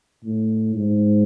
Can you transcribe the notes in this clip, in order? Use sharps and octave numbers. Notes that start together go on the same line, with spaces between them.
A2
G#2